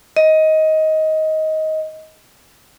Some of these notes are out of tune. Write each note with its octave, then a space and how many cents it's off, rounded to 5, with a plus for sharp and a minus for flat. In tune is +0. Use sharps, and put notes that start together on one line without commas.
D#5 +15